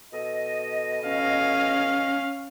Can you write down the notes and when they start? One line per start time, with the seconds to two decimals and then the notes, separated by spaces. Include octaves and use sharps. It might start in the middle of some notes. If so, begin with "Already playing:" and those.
0.12 B2 A4 D#5
1.07 C#4 F5